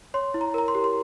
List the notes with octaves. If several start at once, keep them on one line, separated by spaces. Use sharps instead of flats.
C#5 C6
E4
A#5
A#4 A#5
C6
G4
C6